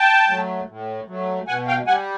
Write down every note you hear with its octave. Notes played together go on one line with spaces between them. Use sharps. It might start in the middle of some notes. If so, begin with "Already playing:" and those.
Already playing: G5 A5
F#3 A3
A2
F#3 A3
B2 F#5 G#5
F5 G5
G3 F#5 G#5